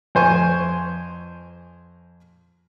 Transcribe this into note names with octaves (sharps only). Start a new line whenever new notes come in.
F2 C5 G#5 C#6